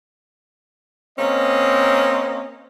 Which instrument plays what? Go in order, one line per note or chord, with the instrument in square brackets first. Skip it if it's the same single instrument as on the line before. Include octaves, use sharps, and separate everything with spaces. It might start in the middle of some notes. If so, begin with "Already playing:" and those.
[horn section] A#3 C4 C#4 D#5